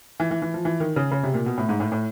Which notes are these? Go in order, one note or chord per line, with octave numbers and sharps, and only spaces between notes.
E3
E3
E3
F3
E3
D#3
C#3
C#3
C3
A#2
B2
A2
G#2
A2
A2